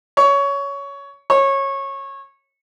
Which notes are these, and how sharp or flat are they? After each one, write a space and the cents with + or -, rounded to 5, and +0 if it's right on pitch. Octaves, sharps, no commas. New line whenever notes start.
C#5 +15
C#5 -20